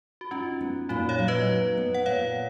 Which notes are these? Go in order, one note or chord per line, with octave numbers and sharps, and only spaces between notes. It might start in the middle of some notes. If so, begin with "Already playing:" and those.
F#4
C#4 D#4 F4
B3
A#2 D#4 F#4
C#5 F5
F#3
B4 D#5
D#4
B3
F#5
A#2 C#5 F5